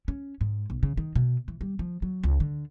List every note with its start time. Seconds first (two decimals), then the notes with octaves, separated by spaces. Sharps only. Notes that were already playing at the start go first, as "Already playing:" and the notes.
0.08 C#4
0.41 G#2
0.70 B1
0.83 C#3
0.97 D#3
1.15 B2
1.48 E3
1.61 G3
1.79 F3
2.02 F#3
2.24 C#2
2.40 D3